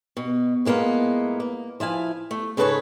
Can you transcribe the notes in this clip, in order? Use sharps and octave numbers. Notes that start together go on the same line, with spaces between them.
B2
A2 G#3 A#3 B3 F4
A#3
F3 E4 F5 G#5
A3
G#2 C#3 A4 B4 C#5 G#5